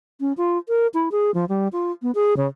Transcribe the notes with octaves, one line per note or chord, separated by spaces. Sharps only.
C#4
F4
A#4
E4
G#4
F3
G3
F4
B3
G#4
C#3